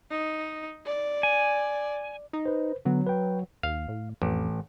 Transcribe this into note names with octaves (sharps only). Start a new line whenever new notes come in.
D#4
D5
G#5
D#4
B4 C5
D3 F#3 B3
B4 G5
D#2 F5
A2
A1 F2